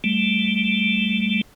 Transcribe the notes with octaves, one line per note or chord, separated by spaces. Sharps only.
G3 A3